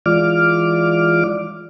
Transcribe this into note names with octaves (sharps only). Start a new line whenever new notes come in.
E3 G#3 F4 D5 D6 F6